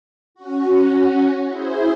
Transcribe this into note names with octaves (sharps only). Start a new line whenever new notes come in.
C#4 F#4
E4 G#4 C5